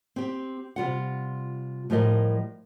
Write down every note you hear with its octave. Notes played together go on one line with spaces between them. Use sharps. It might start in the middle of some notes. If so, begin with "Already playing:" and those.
C4 G4
C3 G3 F4 F#5
A2 F3 G3 A#4 D#5